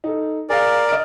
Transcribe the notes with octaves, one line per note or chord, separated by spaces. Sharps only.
D#4 A4
G#4 A#4 D5 F5
D#5 F6 D7